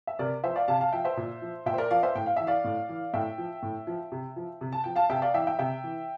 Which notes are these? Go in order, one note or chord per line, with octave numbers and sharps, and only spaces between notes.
E5
C3 A#4 D5
F3 C5 E5
D5 F5
C3 F5 A5
F5 A5
F3 E5 G5
C5 E5
A#2
F3
A#2 E5 G5
C5
A#4 D5
F3 D5 F5
C5 E5
A2 G5
F5
E3 E5
D5 F5
A2
E3
A2 E5 G5
F3
A2
F3
C3
F3
C3
A5
F3 G5
F5 A5
C3 E5 G5
D5 F5
E3 E5 G5
E5 G5
C3 E5 G5
E3